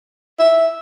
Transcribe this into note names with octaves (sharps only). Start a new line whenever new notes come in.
E5